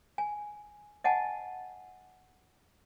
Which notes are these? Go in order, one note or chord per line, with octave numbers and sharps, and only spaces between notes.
G#5
D#5 F#5 G#5 A5